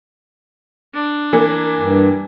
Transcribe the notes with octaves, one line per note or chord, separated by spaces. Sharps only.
D4
E3 A#3
G2